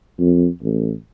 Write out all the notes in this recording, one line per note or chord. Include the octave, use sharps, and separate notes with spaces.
F2
A1